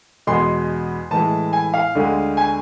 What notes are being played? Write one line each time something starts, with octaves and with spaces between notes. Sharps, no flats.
E2 B2 G#3 C6
A2 E3 G#3 A5
G#5
F5
D2 D3 G#3
G#5